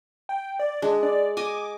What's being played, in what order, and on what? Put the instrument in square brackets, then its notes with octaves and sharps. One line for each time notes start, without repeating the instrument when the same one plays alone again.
[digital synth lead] G5
D5
[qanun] G#3 [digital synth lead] D4
[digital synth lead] D5
[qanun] D#5 G#5 [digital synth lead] D6